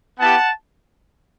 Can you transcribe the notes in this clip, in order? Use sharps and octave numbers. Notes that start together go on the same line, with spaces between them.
B3 E4 G4 F#5 A5